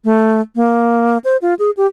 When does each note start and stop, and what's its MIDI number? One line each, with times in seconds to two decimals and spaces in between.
0.04 0.41 57
0.55 1.18 58
1.24 1.37 72
1.42 1.54 65
1.59 1.70 68
1.77 1.86 67